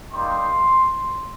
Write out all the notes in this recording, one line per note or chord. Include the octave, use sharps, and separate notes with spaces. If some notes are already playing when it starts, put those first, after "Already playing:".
G3 A#3 D#4 C6